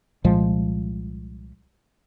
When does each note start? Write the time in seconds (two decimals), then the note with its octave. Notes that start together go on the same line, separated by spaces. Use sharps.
0.24 C2 A#2 F3 G#3